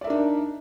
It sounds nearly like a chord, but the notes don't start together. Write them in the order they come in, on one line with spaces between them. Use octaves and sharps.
D5 E5 A#4 D4 D#4